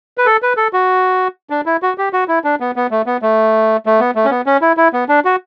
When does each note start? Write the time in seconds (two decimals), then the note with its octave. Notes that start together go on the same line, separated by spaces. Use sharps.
0.18 B4
0.26 A4
0.42 B4
0.57 A4
0.73 F#4
1.50 D4
1.66 E4
1.83 F#4
1.98 G4
2.13 F#4
2.28 E4
2.44 D4
2.60 B3
2.76 B3
2.91 A3
3.06 B3
3.22 A3
3.86 A3
4.00 B3
4.15 A3
4.25 C#4
4.31 B3
4.46 C#4
4.62 E4
4.77 E4
4.93 B3
5.09 D4
5.25 F#4